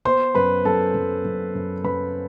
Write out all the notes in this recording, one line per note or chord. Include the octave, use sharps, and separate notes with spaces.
B3 C5 C6
F#2 B4 B5
F#2 A4 A5
F#2
F#2
F#2
F#2 B4 B5